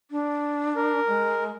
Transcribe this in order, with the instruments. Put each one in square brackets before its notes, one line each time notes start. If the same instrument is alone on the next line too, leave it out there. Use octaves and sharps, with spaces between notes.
[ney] D4
[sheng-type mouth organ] A#4
[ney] G#3